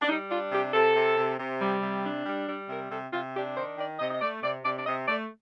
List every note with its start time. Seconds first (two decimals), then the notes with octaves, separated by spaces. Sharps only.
0.02 D4
0.08 G3 D#4
0.30 D4 F4
0.52 C3 G4
0.74 C3 A4
0.95 C3
1.17 C3
1.39 C3
1.60 G3
1.82 C3
2.04 D4
2.25 G3
2.47 G3
2.69 C3 A#4
2.90 C3 A4
3.13 C3 F4
3.34 D4 G4
3.56 D#3 C5
3.78 D#3 D5
3.99 C3 D#5
4.11 D#5
4.21 A3 D5
4.43 C3 D5
4.65 C3 D5
4.77 D5
4.86 C3 D#5
5.08 A3 D5